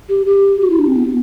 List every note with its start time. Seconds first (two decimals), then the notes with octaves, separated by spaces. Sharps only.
0.09 G4
0.26 G4
0.61 F#4
0.70 E4
0.79 D4
0.87 C4
0.96 B3